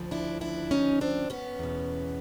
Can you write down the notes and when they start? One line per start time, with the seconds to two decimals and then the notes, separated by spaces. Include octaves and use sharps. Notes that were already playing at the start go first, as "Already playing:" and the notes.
Already playing: D2 C#3 F3
0.11 D4 E4
0.41 D4 E4
0.71 C#4 D#4
1.01 C4 D4
1.30 B3 C#4
1.59 E2 B2